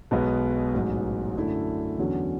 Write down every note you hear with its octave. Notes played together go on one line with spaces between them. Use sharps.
B1 B2 G#3 B3
A1 G#2 F#3
F#2 D3 A3 E4
E2 D3 F#3 C#4 F#4